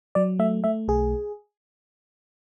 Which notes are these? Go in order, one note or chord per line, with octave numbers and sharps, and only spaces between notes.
F#3 D5
A3 E5
A3 E5
B1 G#4